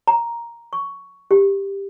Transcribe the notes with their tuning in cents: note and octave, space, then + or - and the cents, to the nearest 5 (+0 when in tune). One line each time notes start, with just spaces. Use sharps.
A#5 +5
C#6 +10
G4 +10